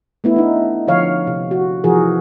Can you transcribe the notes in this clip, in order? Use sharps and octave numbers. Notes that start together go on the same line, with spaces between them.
A3 B3 E4
D4 D#4
D3 F3 C#5 F5
C3
F#4
C3 E3 F3 F#4 G#4 A#4